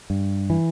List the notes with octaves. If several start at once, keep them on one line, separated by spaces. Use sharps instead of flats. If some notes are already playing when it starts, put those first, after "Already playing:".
G2
E3